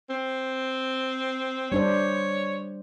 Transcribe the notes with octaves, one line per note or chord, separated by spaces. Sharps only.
C4
G3 D4 C5 C#5